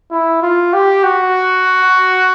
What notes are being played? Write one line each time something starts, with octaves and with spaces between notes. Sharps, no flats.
E4
F4
G4
F#4